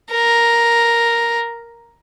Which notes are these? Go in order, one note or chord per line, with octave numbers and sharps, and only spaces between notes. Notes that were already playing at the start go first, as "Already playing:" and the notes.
A#4